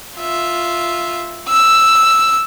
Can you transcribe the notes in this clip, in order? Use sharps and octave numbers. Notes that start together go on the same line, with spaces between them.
F4 E5
E6